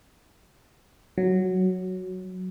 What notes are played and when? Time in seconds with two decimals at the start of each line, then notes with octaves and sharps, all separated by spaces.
1.18 F#3